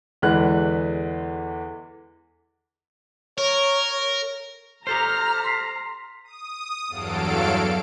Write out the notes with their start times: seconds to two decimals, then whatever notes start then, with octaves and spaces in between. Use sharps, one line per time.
0.22 E2 D3 E3 G#3 B4 F#6
3.38 A#4 C#5
4.87 G4 A4 C5 A#5 F6 G6
5.44 C6 B6 C7
6.24 D#6
6.88 E2 G2 F#3 A4 F5 D7